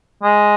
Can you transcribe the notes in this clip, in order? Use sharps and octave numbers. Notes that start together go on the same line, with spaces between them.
G#3